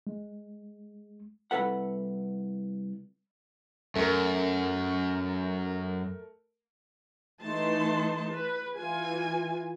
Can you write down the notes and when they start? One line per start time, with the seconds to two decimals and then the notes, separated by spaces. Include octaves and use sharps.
0.07 G#3
1.51 C2 F3 A4 B4 F#5
3.96 F#2 A3 A#4
7.42 E3 A3 D#4 A5 C6
8.31 B4
8.76 E3 F4 G#5